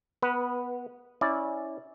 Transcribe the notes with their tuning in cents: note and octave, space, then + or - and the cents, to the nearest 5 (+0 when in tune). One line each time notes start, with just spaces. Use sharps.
B3 +0 B4 -20
C#4 +0 E4 -25 D5 +0